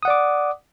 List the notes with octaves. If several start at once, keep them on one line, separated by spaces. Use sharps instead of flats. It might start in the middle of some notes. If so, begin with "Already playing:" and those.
D5 F#5 D6 D#6